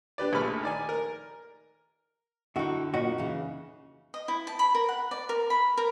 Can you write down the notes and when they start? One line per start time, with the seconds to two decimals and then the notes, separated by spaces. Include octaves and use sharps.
0.18 D4 G4 B4 D5
0.33 A#1 A3 B5 F6
0.63 D#3 D5 G#5
0.89 A#4
2.56 D3 D#4 E4 F#4
2.94 A#2 C#4 D#4 F#4
3.18 C#3 E3
4.14 D#5
4.28 E4
4.47 A5
4.59 B5
4.75 A#4
4.89 F#5
5.11 D5
5.29 A#4
5.50 B5
5.77 A#4